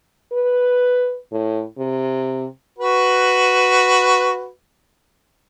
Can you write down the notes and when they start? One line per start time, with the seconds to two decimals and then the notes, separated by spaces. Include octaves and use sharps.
0.32 B4
1.32 A2
1.78 C3
2.79 F#4 B4